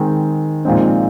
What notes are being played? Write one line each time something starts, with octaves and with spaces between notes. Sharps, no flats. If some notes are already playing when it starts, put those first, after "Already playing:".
Already playing: D#3 G#3 C4
A#2 F3 G#3 C4 D#4